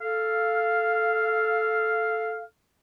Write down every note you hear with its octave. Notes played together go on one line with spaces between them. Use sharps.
A4 F5